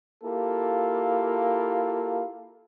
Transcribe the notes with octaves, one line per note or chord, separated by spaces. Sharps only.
A#3 E4 F4 G4 A4